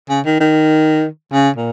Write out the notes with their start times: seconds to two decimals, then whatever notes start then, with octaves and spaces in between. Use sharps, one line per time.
0.09 C#3
0.25 D#3
0.40 D#3
1.33 C#3
1.56 A#2